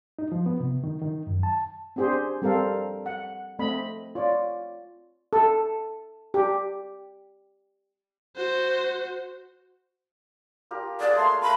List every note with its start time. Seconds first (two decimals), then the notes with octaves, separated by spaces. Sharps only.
0.19 D#4
0.32 F3
0.46 B3
0.60 C3
0.84 D#3
1.01 D#3
1.27 F#2
1.43 A5
1.96 C4 D4 G4 G#4 C5
2.42 G3 C4 A4 A#4 F5
3.06 F#5
3.59 A3 C4 D#5 B5
4.15 F4 C#5 D5
5.33 A4
6.34 G4
8.36 F#4 C5
10.71 F4 G4 A#4
11.00 G#4 D5 F#5 G#5
11.16 A3 A#3 C#5 C6
11.42 A3 A#4 B5 C6